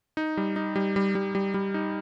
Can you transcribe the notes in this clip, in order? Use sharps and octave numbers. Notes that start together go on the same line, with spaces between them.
D#4
G3
D#4
G3
G3
G3
G3
G3
D#4